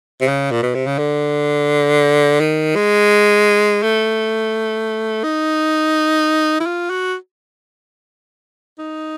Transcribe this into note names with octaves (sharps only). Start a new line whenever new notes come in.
C3
C#3
A#2
B2
C3
C#3
D3
D#3
G#3
A3
D#4
E4
F4
F#4
D#4